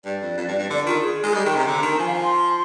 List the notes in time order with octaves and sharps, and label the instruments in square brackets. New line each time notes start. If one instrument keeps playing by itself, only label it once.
[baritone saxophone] G2 [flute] D5
[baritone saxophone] F2
F2
G2
G2
[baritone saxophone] D3 [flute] D5
[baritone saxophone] D#3 [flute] F4
[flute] G#4
[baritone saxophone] G#3
[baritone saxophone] G3 [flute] D#5
[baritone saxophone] D#3 [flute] G5
[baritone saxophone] C3 [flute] A#5
[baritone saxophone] D3 [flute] A#5
[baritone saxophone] D#3
[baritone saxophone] F3 [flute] G#5
[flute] F5
G#5
C6